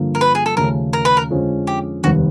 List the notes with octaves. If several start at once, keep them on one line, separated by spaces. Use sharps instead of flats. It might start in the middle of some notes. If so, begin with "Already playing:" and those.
Already playing: G2 D3 F3 A#3
A#4
B4
G#4
A4
D#2 C#3 F3 A3 C#4 A#4
A#4
B4
A#4
F2 D3 F3 G#3 C#4
G4
F1 D#2 D#3 G3 B3 F#4